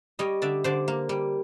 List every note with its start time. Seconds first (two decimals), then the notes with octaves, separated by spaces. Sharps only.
0.19 G3 C#5 D#5
0.42 D3 D5 E5
0.64 D3 C5 D5
0.88 A#3
1.09 G3